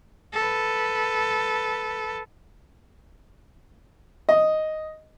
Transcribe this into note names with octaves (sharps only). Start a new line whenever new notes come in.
A4 B4
D#5